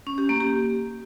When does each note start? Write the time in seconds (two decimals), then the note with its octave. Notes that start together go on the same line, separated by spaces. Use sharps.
0.07 C#4
0.18 G4
0.29 A#3
0.40 G4